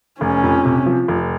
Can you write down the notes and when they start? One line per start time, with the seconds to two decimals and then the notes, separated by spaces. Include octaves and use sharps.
0.21 F1 C#4
0.44 F2
0.65 C3
0.86 F3
1.08 F1